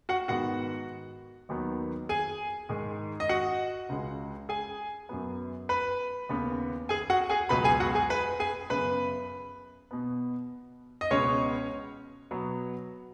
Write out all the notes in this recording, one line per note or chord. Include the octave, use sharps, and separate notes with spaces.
F#4 F#5
G#2 D#3 G#3 B3 F#4 F#5
D#2 D#3 F#3 B3
G#4 G#5
G#2 D#3 G#3
D#5
F#4 F#5
C#2 C#3 G#3
G#4 G#5
F#2 F#3 B3
B4 B5
D#2 C#3 B3
G#4 G#5
F#4 F#5
G#4 G#5
C#2 B2 F#3 B3 B4 B5
G#4 G#5
F#4 F#5
G#4 G#5
B4 B5
G#4 G#5
F#2 C#3 B3 B4 B5
B2 B3
D#5
C#2 B2 G#3 B3 C#4 C#5
B2 F#3 B3